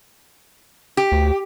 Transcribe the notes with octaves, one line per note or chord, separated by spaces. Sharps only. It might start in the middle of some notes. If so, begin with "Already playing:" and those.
G4
D2